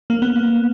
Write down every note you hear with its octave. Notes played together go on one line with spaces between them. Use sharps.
A#3
B3